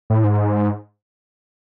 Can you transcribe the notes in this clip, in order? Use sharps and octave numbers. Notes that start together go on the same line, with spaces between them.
A2
G#2